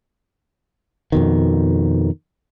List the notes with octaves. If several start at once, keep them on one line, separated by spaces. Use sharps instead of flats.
F2 B2 D#3